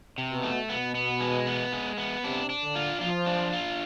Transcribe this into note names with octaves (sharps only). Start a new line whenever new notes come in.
C3
B2
A3
B2 B3
B3
G#3
B3
G#3
B3
C3 D4
D4
D3
F4
F3 F4
D4
F4